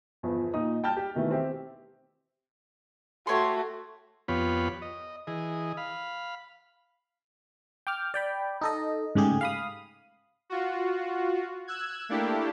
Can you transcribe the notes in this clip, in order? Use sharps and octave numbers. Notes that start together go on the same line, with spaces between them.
G1 E2 F3
A#2 D#4 D#6
G5 A5 F6 G6
G4
B2 D#3 E3 A3
C4 G4 E5
A3 F#4 G4 C#5 C6
F2 B3 F4 G4 C#5 B5
D#5
E3 G#4 D#5
F5 B5
G5 D6 F6
D5 G5 B5
D#4 A4 D#5
G#2 C#3 G#3 A3 G4 G#4
F5 B5 D#6
F4 F#4
E6 F#6 G#6
A3 A#3 D4 E4 G4